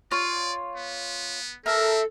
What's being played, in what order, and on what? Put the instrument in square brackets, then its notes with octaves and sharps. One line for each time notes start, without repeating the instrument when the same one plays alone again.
[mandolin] F4 C#5 [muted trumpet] D5
[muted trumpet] B3
[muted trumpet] C4 [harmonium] A4 [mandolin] A#4 [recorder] E5